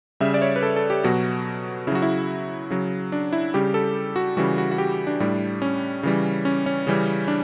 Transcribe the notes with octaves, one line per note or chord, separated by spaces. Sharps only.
C#3 G3 E5
D5
C#5
B4
A4
A4
G4
B2 F#3 F#4
C#3 F#3 E4 F#4
E4
C#3 F#3
D4
E4
C#3 G3 G4
A4
F#4
C#3 E3 G3 F#4
F#4
F#4
G4
D4
A2 G3
C#4
C#3 E3 G3
C#4
C#4
C#3 E3 G3
D4